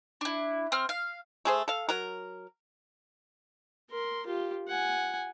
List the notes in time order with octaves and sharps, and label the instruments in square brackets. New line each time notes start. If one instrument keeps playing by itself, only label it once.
[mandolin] D4 E4
C4 F6
F5
[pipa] A3 G#4 C5
A4 F5
F#3 A#4
[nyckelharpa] A#4 C6
F4 G4
F#5 G#5